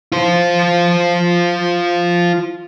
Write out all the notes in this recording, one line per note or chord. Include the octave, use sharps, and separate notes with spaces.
F4 C5